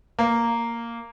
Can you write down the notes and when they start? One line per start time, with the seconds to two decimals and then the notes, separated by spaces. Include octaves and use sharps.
0.19 A#3